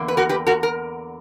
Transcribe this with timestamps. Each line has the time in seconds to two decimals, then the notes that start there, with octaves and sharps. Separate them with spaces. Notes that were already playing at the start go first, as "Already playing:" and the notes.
Already playing: E2 D3 A#3
0.08 B4
0.17 F#4 A#4
0.29 G4 B4
0.47 F#4 A#4
0.63 A#4